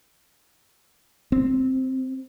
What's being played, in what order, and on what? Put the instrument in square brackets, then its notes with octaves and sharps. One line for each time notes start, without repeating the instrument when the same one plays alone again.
[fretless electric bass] C4